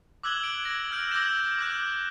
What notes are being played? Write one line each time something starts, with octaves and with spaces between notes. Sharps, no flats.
D6 E6 F#6 G#6 F#7 G7
D7
G#6 A#6
E6 F6 G6 D7
D6 E6 G6 G#6 A#6 E7
D6 F#6 G6